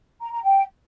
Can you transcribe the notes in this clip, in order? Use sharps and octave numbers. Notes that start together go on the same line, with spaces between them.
A#5
A#5
G5